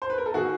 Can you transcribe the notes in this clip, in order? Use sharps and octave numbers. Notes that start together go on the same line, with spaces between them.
C5
B4
A#4
A4
D#3 F#4 G#4